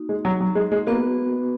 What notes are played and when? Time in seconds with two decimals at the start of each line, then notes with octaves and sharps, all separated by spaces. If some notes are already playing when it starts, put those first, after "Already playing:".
Already playing: A#3 D#4 F#4
0.09 G#3
0.25 F#3
0.41 F#3
0.55 G#3
0.72 G#3
0.87 A#3 B3 F#4 B4